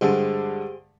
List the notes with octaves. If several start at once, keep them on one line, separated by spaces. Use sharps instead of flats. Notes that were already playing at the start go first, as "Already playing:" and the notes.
G2 D3 G#3 G4 G#4 C5